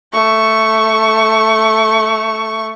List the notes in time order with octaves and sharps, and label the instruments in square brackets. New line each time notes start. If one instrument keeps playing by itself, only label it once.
[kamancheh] A3 C#6